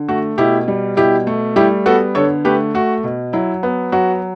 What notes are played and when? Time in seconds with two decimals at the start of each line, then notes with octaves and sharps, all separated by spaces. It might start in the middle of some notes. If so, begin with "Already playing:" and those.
Already playing: D3
0.08 A3 F#4
0.38 B2 E4 G4
0.68 G3
0.97 B2 E4 G4
1.27 A3
1.56 G3 E4 G4
1.86 B3 F#4 A4
2.15 D3 A4 C#5
2.45 A3 G4 B4
2.74 A3 F#4
3.04 B2
3.33 F#3 E4
3.63 B3
3.92 F#3 F#4